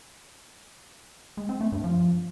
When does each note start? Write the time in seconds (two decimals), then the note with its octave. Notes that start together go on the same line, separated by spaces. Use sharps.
1.37 G#3
1.49 C4
1.61 A3
1.72 G2
1.84 F3